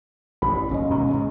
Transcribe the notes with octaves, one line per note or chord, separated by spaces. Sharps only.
A1 G2 B5
F#1 C#4 D#5
C#2 B2 D#3
G#2 G#3